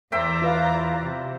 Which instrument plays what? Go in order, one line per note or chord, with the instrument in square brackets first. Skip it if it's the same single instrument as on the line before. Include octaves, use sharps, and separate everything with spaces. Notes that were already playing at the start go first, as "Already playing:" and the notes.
[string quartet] E2 D5 A#5 [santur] C5 E5 G5
[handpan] F4 B4 F5
[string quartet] C3